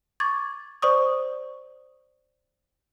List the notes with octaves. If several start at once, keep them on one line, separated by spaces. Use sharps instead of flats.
C#6 D6 G#6 A6
C5 D5 C#6 D#6